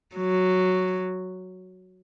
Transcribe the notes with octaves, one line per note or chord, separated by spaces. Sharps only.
F#3